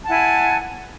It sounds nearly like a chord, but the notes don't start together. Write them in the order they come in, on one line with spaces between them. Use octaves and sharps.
A5 F#5 E4 G#5